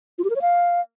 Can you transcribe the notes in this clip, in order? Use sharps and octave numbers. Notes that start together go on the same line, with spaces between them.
F4
G4
A#4
C#5
F5